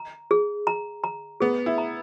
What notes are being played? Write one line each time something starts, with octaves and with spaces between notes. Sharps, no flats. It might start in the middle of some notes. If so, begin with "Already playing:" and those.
Already playing: A#5
G#4
A#5
A#5
B3 G#4
E4
A#5